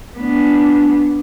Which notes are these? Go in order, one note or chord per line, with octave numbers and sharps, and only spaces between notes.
B3 D4